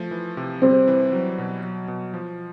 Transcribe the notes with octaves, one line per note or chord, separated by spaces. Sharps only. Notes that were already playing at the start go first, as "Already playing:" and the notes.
Already playing: F3 A3
E3
C3
G3 C4
E3
F#3
B2
F#3
B2
F3